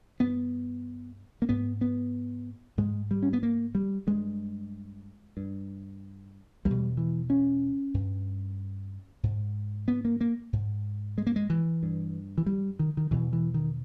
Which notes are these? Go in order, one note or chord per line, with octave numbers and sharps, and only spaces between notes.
G2 B3
A#3
G#2 B3
B3
G#2 G#3
G3
C#4
B3
A#3
G3
G2 G#3
G2
E2 G3
B2
E3
C#4
G2
G#2
B3
A#3
A#3
G#2
G#3
A#3
G#3
E3
G2
E3
G3
D#3
D#3
E2 B2 E3
E3
D#3